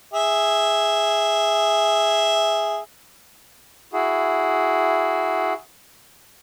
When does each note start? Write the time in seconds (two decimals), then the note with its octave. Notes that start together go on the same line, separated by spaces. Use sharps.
0.13 G#4 E5
3.93 E4 F#4 G#4